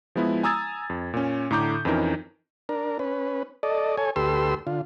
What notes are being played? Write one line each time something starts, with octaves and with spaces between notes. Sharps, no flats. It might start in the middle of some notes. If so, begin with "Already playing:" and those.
F3 G#3 B3 E4
G#5 A#5 D#6 E6 G#6 A6
F2
A#2 C#4
A2 D3 A#5 D6 G6
F2 E3 C#4 D#4 A#4
D4 A#4
C#4 B4
A4 D5 D#5
A4 C#5 G#5
D2 G4 A4 B4 C6 E6
D3 F4